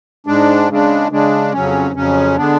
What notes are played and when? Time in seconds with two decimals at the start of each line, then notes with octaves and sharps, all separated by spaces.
0.27 G#2 G#3 D4
0.69 C#3 G#3 D4
1.11 C#3 G#3 D4
1.52 F2 C#3 F#3 C#4
1.95 F2 C#3 F#3 C#4
2.37 D3 G#3 B3 D4